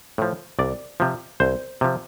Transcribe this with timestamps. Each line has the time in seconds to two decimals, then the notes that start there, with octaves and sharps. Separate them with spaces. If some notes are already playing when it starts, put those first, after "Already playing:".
0.18 A2 F3
0.59 C2 D5
1.00 C3 F3
1.40 C2 C5
1.81 C3 F3